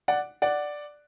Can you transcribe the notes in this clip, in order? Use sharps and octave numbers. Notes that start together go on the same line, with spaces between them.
D5 F#5
D5 F#5